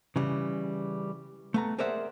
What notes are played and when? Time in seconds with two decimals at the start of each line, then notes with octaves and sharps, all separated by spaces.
0.16 C#3 E3 G3
1.54 A3 B3 A#5
1.79 G#4 A#4 C5 D5 E5 F#5